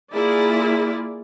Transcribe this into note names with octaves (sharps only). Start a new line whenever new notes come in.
A#3 E4 F4 G#4 D5